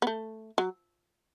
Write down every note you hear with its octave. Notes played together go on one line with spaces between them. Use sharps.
B3
A3
F#3